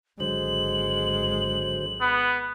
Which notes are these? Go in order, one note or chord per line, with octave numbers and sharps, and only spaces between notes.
G#1 D3 F#3 G#3 C5 F#7
B3